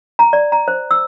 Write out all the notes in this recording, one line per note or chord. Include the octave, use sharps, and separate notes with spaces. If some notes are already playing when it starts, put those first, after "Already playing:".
A#5
D5
A#5
C5
E6